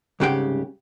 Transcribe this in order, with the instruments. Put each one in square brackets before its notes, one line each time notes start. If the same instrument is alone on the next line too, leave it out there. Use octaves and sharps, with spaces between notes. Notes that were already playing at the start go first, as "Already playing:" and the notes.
[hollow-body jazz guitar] C2 G#2 C#3 G4 F#5 G5